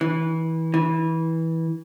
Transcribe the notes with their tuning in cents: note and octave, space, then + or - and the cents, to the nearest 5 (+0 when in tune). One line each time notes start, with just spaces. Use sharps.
E3 -25
E3 -20